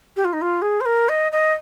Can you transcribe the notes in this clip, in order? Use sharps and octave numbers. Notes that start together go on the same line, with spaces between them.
G4
F4
D#4
F4
G#4
C5
A#4
D#5
D#5